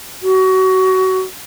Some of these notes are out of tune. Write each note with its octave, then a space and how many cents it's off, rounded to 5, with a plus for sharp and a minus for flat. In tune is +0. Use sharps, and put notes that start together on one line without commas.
F#4 +25